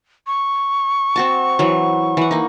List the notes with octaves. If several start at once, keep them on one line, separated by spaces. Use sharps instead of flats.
C#6
C4 F#4 A5
E3 F#3
E3 F#5
A#3 D#4